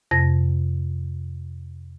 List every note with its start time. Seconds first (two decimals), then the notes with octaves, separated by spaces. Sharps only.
0.11 F2 C3 A#6